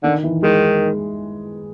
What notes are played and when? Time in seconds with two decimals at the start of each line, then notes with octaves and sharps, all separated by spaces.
0.03 D3 D#3
0.23 E3
0.43 D#3 G#3